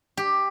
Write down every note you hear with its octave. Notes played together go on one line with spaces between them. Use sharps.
G4